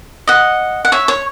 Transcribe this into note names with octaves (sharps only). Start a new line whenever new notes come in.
D#5 F#5
F#5
C#5 E5
C#5